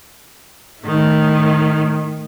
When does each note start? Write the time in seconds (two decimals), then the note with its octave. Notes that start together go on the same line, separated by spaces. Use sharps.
0.81 A2 D#3